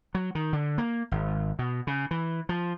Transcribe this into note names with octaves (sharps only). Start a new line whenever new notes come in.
F#3
D#3
D3
A#3
G#1
B2
C#3
E3
F3